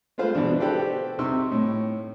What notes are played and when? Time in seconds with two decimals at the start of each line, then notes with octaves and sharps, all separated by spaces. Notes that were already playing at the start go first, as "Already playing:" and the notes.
0.18 G#3 A3 F4 B4 C5 F5
0.35 B2 D3 E3 D4
0.60 F#4 G4 A4 B4 C5 D5
1.19 C3 D#4 C6 C#6 E6
1.52 A2